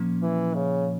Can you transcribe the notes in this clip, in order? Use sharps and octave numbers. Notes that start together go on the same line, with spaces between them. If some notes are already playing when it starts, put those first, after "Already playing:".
Already playing: A#2 F3 A#3 C#4
E3
C#3